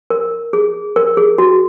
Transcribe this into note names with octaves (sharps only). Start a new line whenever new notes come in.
A#4
G#4
A#4
G#4
F#4